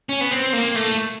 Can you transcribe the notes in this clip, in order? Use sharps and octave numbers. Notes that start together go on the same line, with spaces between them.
C#4
B3
C4
A#3
A3